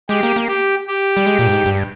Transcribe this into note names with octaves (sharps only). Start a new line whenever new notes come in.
G#3 G4
A#3
A#3
G4
G4
G3
G#3
A#2
G2
G#2
G2